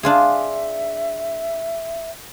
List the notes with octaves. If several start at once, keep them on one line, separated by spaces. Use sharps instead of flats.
D4 F4 G#4 E5